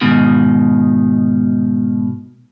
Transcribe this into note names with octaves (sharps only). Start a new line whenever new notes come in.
G#2 B2 D#3